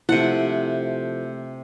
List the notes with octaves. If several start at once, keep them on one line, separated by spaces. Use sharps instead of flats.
C3 F3 A3 E4 F#5